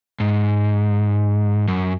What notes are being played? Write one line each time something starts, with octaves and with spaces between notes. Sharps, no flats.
G#2
F#2